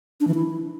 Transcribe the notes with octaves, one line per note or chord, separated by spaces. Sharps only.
D4
E3
E4